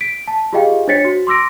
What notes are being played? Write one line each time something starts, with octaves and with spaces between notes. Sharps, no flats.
B6 D7
A5
F4 G4 G#4 D#5 F5 G5
D4 C5 C#5 A6 B6 C#7
F#4
C6 D6 E6 A#6 D7